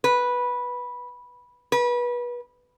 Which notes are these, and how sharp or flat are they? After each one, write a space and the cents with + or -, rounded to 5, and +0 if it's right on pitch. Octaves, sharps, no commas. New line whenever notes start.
B4 -10
B4 -30